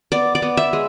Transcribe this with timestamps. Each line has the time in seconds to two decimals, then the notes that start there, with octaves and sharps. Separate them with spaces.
0.12 B3 D5
0.35 D5
0.42 B3
0.57 E5
0.73 G#3